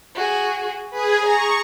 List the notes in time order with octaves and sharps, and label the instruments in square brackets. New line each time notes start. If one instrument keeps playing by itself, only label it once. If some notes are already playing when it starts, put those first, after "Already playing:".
[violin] F#4 G#4
[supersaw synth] G#4 [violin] B4
[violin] A#5 [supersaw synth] C#6